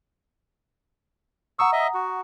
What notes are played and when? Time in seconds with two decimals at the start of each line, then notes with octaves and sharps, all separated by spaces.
1.59 F#5 A#5 C#6 D#6 E6
1.73 D#5 E5
1.94 F#4